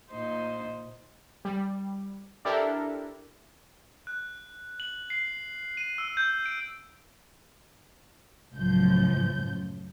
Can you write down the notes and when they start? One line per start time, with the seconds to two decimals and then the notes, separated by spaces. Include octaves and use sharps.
0.10 A#2 D#4 C5
1.45 G3
2.45 D4 E4 G4 A4 A#4
4.07 F#6
4.80 F#7
5.10 C7
5.77 D#7
5.98 E6
6.17 G6
6.46 D7
8.53 C#2 F#2 A2 F3 G6